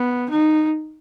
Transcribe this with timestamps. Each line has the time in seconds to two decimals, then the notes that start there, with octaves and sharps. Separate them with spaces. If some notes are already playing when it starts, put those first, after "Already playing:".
Already playing: B3
0.30 D#4